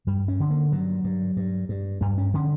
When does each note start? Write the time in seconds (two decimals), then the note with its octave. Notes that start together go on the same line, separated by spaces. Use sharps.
0.07 G2 G3
0.28 C#4
0.40 D3
0.50 A#3
0.72 G2 F#3
1.04 G2
1.37 G2
1.69 G2
2.01 G2 G3
2.18 C#4
2.34 D3 C#4